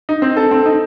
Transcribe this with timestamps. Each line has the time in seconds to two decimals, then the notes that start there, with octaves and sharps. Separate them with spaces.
0.09 D#4
0.22 C4
0.36 A4
0.51 C4
0.66 D#4